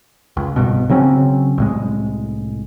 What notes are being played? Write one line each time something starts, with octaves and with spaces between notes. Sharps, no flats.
C#2
C2 G2 B2
C#3 F#3 C4 C#4
C2 A2 G#3